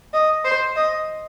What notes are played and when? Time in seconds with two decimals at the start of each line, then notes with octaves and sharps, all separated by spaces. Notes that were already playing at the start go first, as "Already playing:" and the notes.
0.14 D#5
0.45 C5
0.76 D#5